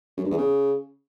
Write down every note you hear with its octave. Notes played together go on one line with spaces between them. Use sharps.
F#2
G2
E2
C#3